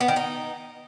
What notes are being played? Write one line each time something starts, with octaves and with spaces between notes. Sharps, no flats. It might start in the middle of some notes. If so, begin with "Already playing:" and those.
B3
D#3
D#4